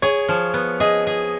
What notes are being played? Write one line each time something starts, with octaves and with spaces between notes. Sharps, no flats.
G#4 C#5
F3
B3
G#4 D#5
G#4